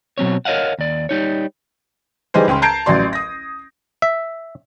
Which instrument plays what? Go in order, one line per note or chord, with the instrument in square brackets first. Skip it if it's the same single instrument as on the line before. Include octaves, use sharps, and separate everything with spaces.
[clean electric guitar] B2 F#3 C4 C#5
A#4 C#5 D#5 F5 F#5
D#2 D5
G3 D#4 C#5
[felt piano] E3 G3 D#4 G#4 C5
C#2 C#4 G5 C6
A5 A#5 G6 G#6 C7 D7
A1 F#3 D5 C6
D#6 A#6
[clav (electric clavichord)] E5